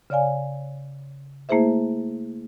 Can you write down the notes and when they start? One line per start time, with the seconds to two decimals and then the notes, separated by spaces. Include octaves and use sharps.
0.10 C#3 C#5 D5 F5 G#5
1.49 A3 A#3 E4 G#4 C5 E5